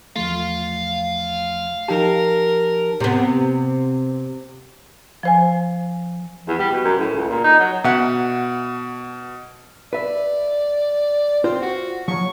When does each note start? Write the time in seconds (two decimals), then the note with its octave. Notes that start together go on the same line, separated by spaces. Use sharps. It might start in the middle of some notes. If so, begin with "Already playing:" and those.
0.16 E2 F3 A3 F5 C6
1.88 F3 D#4 G4 A#4 A5
3.00 C3 B3
5.23 F3 C5 G#5
6.48 E2
6.59 G3
6.71 B2
6.84 F#2
6.99 A2
7.14 C#2
7.29 A#2
7.44 D#4
7.59 F#3
7.84 B2 E5 F#5
9.93 B4 D5 E5
11.44 C4 F4 C5
11.62 F#4
12.08 F3 F#3 C#6